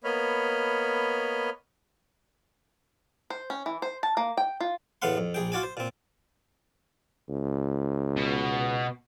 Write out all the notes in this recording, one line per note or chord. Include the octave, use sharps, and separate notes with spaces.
A#3 B3 C#5 D#5 B5 F6
C5
C#4
E3
C5
A5
A#3
G5
F4
E2 A2 B3 F5 F#5 C6
F2
A#1 G#4 G5
F4 F#4 D5 G#5
C5
A#2 C4
C#2
B2